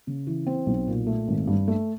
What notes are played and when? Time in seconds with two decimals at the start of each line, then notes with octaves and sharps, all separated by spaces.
0.07 C#3
0.27 E3
0.47 C4
0.67 B1
0.88 A#2
1.07 A3
1.28 G#1
1.47 G2
1.68 A3